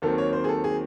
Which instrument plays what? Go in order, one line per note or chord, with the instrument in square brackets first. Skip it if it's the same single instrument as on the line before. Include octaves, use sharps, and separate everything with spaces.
[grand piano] D#2 D#3 F#3 C4 A4
C#5
C5
G#4
A4
G#4